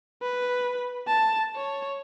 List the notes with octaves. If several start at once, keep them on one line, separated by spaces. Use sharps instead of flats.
B4
A5
C#5